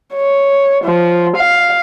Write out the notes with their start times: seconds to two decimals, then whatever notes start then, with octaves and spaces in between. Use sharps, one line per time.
0.14 C#5
0.84 F3
1.36 F5